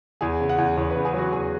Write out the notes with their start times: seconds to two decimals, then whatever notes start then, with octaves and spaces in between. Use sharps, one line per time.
0.21 E2 G#4
0.40 C#3
0.49 F#5
0.58 E2
0.77 E2 C#5
0.90 B4
0.96 C#3
1.05 G#4
1.13 F#3 F#4
1.33 E2 G#4